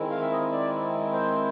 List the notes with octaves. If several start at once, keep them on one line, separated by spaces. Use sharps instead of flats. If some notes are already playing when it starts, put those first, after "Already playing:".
Already playing: D#3 G#3 C4 E4
F5
E5
D#5
D5
C5